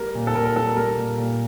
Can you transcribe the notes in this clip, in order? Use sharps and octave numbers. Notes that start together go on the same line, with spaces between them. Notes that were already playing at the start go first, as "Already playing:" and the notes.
Already playing: G3 A#4
A#2
A4
A#2 A#4
A#4
G3 A4
G3 A#4
A#2
A#2